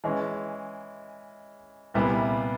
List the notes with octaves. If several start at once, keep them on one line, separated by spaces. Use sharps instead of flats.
E3 G#3 C#4
C2 A#2 G3 B3 E4